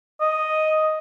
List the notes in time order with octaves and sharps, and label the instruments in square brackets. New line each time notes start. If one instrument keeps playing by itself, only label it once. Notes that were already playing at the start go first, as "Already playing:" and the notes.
[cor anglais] D#5